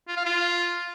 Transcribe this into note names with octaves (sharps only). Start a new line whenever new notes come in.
F4
F5
F4